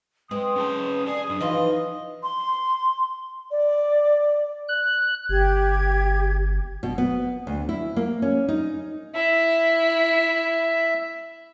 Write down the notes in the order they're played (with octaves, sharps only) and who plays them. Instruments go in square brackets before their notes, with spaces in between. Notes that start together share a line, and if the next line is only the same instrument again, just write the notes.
[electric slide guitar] G#3 [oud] C4 [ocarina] B4 [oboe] D#6
[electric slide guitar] C#4 G#4 A5
[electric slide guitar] G#4 G#5 [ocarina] D5
[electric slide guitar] F#2 [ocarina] D4
[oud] E3 F3 F4 [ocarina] D#4 [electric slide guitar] D#5
[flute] C6
D5
[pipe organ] F#6
[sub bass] G1 [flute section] G4 G#6
[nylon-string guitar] B2
B3
D2
E4
A#3
C#4
D#4
[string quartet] E4 [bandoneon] E5